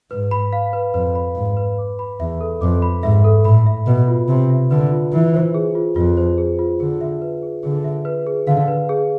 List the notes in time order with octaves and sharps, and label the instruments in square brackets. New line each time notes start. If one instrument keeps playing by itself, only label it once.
[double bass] G#2 [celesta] B4
[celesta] B5
F5
B4
[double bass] F2 [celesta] B4
[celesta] B5
[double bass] G#2 [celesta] F5
[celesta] B4
D6
B5
[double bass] E2 [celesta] E5
[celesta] A4
[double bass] F2 [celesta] D6
[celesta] B5
[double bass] G#2 [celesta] E5
[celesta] A4
[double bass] A2 [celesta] B5
[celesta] E5
[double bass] B2 [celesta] B4
[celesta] F4
[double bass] C3 [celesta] B5
[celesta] E5
[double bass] D3 [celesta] B4
[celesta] F4
[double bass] E3 [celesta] F4
[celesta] C5
G#4
F4
[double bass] F2 [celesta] F4
[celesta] C5
G#4
F4
[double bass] D3 [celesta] G#4
[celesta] E5
B4
G#4
[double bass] D3 [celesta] G#4
[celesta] E5
B4
G#4
[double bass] D3 [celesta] F5
[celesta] B4
G#4